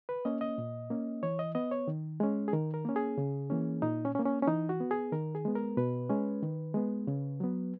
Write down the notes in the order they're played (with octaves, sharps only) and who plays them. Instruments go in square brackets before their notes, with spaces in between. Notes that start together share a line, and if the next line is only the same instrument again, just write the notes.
[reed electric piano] B4
A#3 C#4 D#5
D#5
A#2
A#3 C#4
E3 C#5
D#5
B3 D#5
C#5
D#3
G#3 C#4
G#4
D#3 A#4
A#4
A#3 C#4
G#4
C#3
E3 A#3 C#4
A#2 D#4
C#4
C#4
A#3
C#4
C#4
E3 D#4
F#4
B3
G#4
D#3 A#4
G#4
G#3 B3
A#4
B2 B4
G#3 C#4
D#3
G#3 B3
C#3
F#3 B3